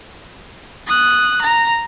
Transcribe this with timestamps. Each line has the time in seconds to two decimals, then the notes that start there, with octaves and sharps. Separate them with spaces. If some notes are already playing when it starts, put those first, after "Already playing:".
0.87 D#6 F#6
1.42 A#5